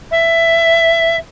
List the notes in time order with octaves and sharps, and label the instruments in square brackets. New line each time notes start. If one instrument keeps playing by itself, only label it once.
[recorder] E5